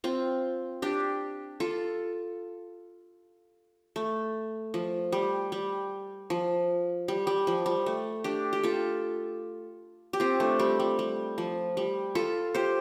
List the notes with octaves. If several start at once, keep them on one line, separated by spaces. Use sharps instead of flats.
C4 F4
D4 G4
F4 A4
A3
F3
G3
G3
F3
G3
G3
F3
G3
A3
D4 G4
G4
F4 A4
G4
C4 F4
A3 D4
G3 C4
G3
G3
F3
G3
F4 A4
G4 C5